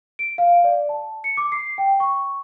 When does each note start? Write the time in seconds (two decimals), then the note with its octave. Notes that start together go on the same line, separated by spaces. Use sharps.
0.19 D7
0.38 F5
0.64 D5
0.89 A5
1.24 C#7
1.37 D6
1.52 C7
1.78 G5
2.00 C#6